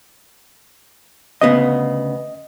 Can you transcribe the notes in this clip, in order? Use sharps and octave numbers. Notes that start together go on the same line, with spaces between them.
D2 C#3 B3 D#5